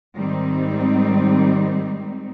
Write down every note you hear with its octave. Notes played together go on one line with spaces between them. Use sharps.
G#2 D#3 G3 C4 D#4